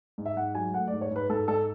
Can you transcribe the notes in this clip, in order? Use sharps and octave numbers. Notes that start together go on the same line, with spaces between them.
G#2
E5
G#2 F#5
F#3 G#5
A3 F#5
D5
G#2
C#5
G#2
B4
G#2 A4
G#2 A4